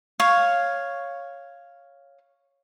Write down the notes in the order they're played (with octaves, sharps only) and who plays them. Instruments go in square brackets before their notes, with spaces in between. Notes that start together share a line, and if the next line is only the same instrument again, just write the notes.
[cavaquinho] C#5 F5